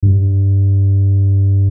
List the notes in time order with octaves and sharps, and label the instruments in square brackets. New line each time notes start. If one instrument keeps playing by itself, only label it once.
[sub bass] G2